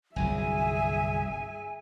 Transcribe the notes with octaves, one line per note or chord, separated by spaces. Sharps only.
G1 C2 F#3 G#4 E5 G#5